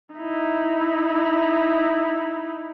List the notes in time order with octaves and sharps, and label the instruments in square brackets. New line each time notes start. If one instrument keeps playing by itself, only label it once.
[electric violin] D#4 E4